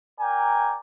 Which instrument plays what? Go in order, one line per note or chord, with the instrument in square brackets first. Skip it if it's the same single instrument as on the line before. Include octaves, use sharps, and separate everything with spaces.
[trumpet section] A#4 D5 G5 G#5 A#5